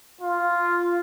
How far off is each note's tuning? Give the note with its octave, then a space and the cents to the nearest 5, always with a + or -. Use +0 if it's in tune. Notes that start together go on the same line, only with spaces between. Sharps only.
F4 -5